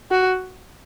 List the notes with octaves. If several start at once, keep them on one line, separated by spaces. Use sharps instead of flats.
F#4